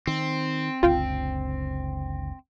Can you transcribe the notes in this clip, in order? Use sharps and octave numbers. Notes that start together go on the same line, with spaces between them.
D#3 C4
F#1 C#2 D3 F4 F5 G5